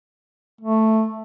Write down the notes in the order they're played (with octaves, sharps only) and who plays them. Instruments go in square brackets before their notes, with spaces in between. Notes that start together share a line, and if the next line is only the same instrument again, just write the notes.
[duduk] A3